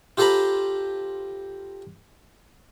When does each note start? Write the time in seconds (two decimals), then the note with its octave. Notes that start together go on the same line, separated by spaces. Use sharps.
0.17 F4 G4 A4 C5 A#5 B5